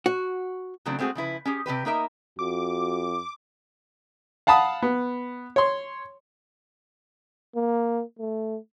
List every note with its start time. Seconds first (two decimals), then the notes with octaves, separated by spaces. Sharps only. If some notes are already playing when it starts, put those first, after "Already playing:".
0.06 F#4
0.85 C#3 E3 F#3 A3 C4 D4
0.99 G#3 A3 C4 F#4 G#4
1.15 C#3 F3 E4 B4
1.45 C#4 G4 G#4
1.66 C3 E3 G4 B4
1.85 A#3 D#4 A#4 E5
2.39 F2 F#4 D6
4.47 F5 F#5 A5 B5 D#6
4.83 B3
5.56 C#5 C6
7.56 A#3
8.19 A3